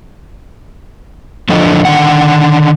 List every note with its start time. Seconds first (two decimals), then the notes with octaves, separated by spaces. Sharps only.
1.49 E2 D3 F3 D4 A4 D#5
1.85 D3 D#3 F#5